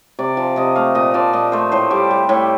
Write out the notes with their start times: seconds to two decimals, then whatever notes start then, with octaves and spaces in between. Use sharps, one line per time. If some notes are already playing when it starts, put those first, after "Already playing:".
0.19 C3 D5
0.37 F3
0.56 C3 D#5
0.75 A3 F5
0.95 A#2 D#5
1.14 F3 D5
1.33 A#2 D#5
1.52 A3 C5
1.72 A2 C5
1.90 G3 D5
2.11 G3
2.29 A2